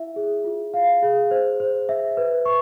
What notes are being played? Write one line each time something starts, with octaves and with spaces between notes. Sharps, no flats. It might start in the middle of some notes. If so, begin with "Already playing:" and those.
Already playing: E4 E5
G#4
F4
F5
G#4
C5
C5
E5
B4
C#6